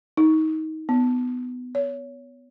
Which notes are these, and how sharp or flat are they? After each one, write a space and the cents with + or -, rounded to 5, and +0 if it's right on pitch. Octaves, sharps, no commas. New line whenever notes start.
D#4 +20
B3 +15
C#5 +20